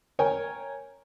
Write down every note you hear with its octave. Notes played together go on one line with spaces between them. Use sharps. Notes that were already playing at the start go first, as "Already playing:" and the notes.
A#4 C#5 G5 G#5